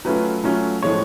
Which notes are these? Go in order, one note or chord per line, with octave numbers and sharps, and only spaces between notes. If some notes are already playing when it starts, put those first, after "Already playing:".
F#3 A3 C#4 F4 B4
F#3 A3 C#4 F4
A2 F3 G#3 C#5